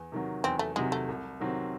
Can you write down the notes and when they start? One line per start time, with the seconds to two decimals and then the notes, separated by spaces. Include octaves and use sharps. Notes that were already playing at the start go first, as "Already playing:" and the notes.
Already playing: E2
0.12 C3 D#3 F#3
0.44 E2 C4
0.59 A3
0.76 C3 D#3 F#3 G#3
0.92 A3
1.08 C2
1.40 C3 D#3 F#3 C4